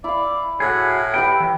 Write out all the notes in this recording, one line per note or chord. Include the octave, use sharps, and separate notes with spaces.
E4 D5 F5
A2 F#4 G#4
E4 G4 B4 G5
E3